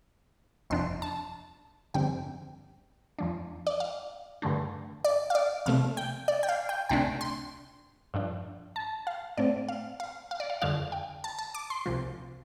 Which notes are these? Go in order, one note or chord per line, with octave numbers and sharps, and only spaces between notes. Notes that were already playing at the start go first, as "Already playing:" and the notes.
G1 F2 C3 F3 D4 C6
A5
G1 F2 D3 G3 C4 G5
F2 F3 D4
D5
F5
G2 D3 A3 D4
D5
F5
D5
C2 C3 A3 F5
G5
D5
G5
F5
G5
C2 C3 A3 D4 G5
C6
G2 F3 D4
A5
F5
A2 A3 C4 D5
F5
F5
F5
D5
F5
F2 D3 G3 D4 F5
G5
A5
A5
D6
C6
C2 C3 F3